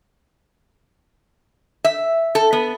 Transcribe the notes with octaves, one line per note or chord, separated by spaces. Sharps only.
E5
A4
B3